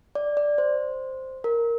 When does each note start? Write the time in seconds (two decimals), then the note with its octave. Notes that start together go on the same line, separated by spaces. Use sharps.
0.15 D5
0.37 D5
0.58 C5
1.44 A#4